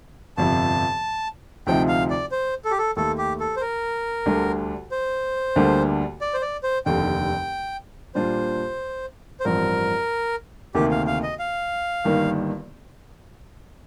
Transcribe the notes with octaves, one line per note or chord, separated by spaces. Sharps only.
G1 F2 C3 A5
D2 C3 F3 C4 D#4 G5
F5
D5
C5
A4
G4
A4
D#2 D#3 A3 A4
G4
A4
C5
A#4
D2 D3 G3 D4
C5
D2 D3 G3 A#3 D4
D5
C5
D5
C5
F1 D#2 D3 G5
A#2 G3 D4 F4 C5
C5
A1 G2 F3 C4 A#4
D2 C3 D#3 A#3 G4
F5
F5
D#5
F5
G1 G2 D#3 A#3